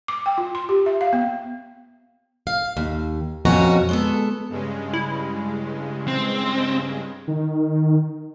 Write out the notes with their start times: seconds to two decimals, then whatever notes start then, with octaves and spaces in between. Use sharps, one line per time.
0.08 D6
0.26 G5
0.38 F4
0.55 C6
0.69 G4
0.86 E5
1.01 F5
1.13 B3
2.47 F5
2.77 D#2
3.45 F2 B2 C#4 F#4 A#5
3.89 G#3 B3 A4
4.49 G2 C#3 G#3
4.93 E4
6.08 C4
7.28 D#3